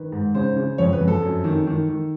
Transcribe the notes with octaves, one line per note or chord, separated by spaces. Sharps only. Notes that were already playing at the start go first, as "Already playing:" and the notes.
Already playing: D#3 B4
G#2
C#3 C5
C#3
F2 C#5
B4
F2
A4
F#2
D#3
D#3
D#3